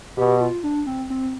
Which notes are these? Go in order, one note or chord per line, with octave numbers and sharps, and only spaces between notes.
B2 G4
F4
D4
C4
C4